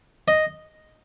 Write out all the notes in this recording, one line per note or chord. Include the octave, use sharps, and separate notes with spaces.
D#5